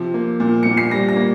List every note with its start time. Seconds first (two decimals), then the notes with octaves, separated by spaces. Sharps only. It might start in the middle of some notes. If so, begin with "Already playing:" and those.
Already playing: C3 F3
0.14 A#3
0.40 A#2
0.63 A#2 C#7
0.77 C7
0.91 G3 A#6
1.09 A#6
1.16 A#3